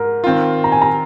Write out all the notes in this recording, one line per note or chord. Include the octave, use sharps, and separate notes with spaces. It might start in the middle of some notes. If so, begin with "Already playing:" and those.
Already playing: G#2 A#4
D#3 C4 F4
A#5
G#5
A#5